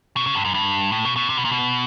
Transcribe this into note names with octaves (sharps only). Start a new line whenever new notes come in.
B2
C#3
G2
F#2
G2
A2
B2
B2
C3
B2
A#2
B2